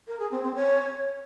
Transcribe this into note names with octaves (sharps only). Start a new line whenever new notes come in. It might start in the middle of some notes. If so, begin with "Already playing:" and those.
A#4
G#4
C4
C4
C#5